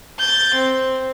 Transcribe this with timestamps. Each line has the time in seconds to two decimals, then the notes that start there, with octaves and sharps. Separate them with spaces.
0.19 G6 A6
0.56 C4